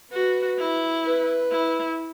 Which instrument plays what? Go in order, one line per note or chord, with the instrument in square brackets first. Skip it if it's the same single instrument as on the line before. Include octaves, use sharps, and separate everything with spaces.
[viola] F#4 [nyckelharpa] B4
[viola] E4
[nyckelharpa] B4
[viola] E4